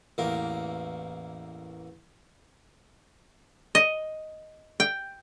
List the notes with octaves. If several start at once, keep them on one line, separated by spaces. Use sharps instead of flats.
A1 E2 A#3
D#5
G5